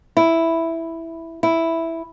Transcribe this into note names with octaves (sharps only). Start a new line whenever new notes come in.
E4
E4